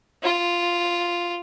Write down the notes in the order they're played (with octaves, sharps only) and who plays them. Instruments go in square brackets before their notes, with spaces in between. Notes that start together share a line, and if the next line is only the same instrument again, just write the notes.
[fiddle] F4